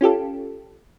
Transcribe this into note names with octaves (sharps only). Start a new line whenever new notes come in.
C#4 F4 G4 A4